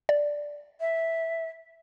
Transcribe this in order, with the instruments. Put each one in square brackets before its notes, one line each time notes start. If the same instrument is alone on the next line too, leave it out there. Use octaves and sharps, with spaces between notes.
[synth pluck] D5
[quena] E5